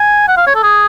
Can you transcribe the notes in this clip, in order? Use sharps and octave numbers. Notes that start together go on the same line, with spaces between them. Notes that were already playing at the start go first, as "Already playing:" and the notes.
Already playing: G#5
F#5
F5
C#5
A4
G#4